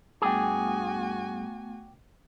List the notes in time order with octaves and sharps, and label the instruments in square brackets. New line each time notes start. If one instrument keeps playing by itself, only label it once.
[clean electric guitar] G2 G#4 [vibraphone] A3 B3 [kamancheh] F#4 G#5 [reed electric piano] G5 D6